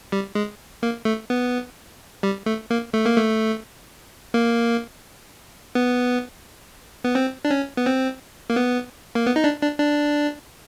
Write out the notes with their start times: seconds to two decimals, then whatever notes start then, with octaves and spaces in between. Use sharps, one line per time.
0.12 G3
0.35 G#3
0.83 A#3
1.05 A3
1.30 B3
2.23 G3
2.46 A3
2.70 A#3
2.93 A3
3.06 A#3
3.17 A3
4.34 A#3
5.75 B3
7.04 B3
7.15 C4
7.45 D4
7.50 C#4
7.77 B3
7.86 C4
8.50 A#3
8.56 B3
9.15 A#3
9.26 B3
9.36 D#4
9.44 D4
9.62 D4
9.80 D4